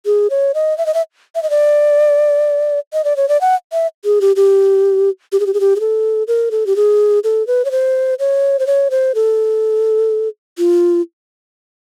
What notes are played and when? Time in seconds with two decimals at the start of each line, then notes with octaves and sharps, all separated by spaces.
0.06 G#4
0.30 C#5
0.54 D#5
0.78 E5
0.86 D#5
0.94 E5
1.35 E5
1.43 D#5
1.50 D5
2.93 D#5
3.04 D5
3.17 C#5
3.29 D5
3.41 F#5
3.73 E5
4.05 G#4
4.21 G4
4.36 G4
5.32 G4
5.40 G#4
5.46 G4
5.54 G#4
5.60 G4
5.76 G#4
5.80 A4
6.28 A#4
6.51 A4
6.67 G4
6.76 G#4
7.24 A4
7.47 B4
7.65 C#5
7.71 C5
8.19 C#5
8.59 C5
8.67 C#5
8.91 C5
9.15 A4
10.58 F4